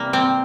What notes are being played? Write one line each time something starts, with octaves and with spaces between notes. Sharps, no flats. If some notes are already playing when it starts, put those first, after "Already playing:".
Already playing: C3 E3 G3 A#3
C4